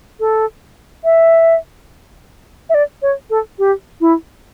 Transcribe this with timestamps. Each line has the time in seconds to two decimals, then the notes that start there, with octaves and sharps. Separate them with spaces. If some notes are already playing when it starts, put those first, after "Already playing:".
0.20 A4
1.04 E5
2.69 E5
2.74 D5
3.02 C#5
3.30 A4
3.58 G4
4.01 E4